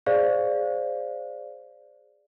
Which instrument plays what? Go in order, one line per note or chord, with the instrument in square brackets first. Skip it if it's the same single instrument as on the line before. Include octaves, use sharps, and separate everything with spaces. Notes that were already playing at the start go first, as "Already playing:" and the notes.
[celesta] G#4 C5 D5 F5